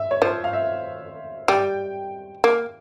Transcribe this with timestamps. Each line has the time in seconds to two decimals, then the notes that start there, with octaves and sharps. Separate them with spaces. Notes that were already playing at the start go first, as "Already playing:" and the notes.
Already playing: E5
0.11 C#5
0.22 F3 C5
0.44 F5
0.53 E5
1.48 G3 G5
2.44 A#3